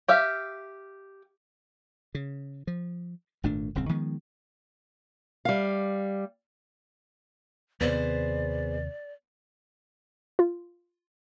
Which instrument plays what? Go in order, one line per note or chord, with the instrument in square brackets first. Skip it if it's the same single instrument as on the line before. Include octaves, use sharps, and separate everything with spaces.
[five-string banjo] G4 E5 F5
[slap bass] C#3
F3
G#1 A#2 A3 D4
D#1 C2 C#3 C4
D#3 F3 G#3 B3
[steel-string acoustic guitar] G3 F5
[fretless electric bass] D#2 C3 [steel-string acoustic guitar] B3 G#4 C5 [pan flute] D5
[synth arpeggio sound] F4